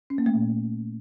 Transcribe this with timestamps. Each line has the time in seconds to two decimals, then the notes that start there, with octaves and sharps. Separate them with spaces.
0.10 C#4
0.18 A#3
0.26 A3
0.34 A#2